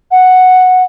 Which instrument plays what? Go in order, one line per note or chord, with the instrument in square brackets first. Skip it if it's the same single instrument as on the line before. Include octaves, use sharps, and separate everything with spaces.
[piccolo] F#5